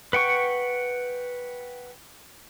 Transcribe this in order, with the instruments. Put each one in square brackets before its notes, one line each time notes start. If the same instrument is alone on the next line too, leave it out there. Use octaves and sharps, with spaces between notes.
[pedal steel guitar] B4 F#5 G5 C#6